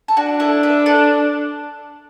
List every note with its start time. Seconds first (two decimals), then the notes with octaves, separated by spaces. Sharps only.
0.08 A4
0.17 D4 F#4
0.40 E4 A4
0.63 B4 E5
0.86 A4 D5